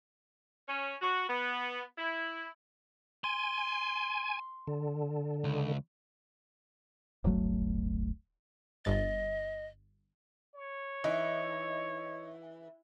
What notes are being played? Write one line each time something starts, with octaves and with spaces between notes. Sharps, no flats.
C#4
F#4
B3
E4
G#5 C6
D3
C#2
D1 G1 F#3 A3
G1 G2 D#5 A6
C#5
E3 D#4